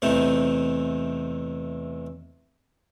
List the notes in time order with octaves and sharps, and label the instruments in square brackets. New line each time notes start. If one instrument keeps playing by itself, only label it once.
[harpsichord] E2 C3 E3 A3 D#4